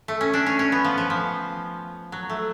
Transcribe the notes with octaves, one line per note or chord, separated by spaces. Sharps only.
A3
C#4
D4
C#4
C#4
B3
F3
F3
F3
F#3
A3